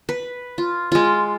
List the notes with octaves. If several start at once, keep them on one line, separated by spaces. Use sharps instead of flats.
B4
F4
G#3 F4